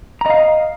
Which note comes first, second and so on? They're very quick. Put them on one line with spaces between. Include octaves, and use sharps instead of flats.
A#5 D#5 F5